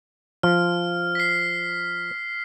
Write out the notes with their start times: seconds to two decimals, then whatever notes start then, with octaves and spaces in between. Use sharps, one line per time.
0.43 F3 F6
1.15 B6 C7